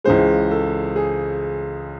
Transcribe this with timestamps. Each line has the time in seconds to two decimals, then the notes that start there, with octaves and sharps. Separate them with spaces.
0.04 C#2 C#3 E3 G#3 C5
0.51 A4
0.96 G#4